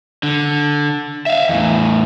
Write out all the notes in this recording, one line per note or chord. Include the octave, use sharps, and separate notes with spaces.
D3
E5 F5
E2 A2